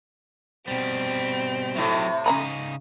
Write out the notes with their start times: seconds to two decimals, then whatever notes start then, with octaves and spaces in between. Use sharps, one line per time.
0.68 B2 G3 C4
1.75 A2 C3 F#3 D#4
2.26 C#3 C#4 D#4 A#5 B5